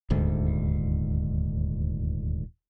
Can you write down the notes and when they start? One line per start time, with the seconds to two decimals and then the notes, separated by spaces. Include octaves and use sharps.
0.10 D#1 D2 G#2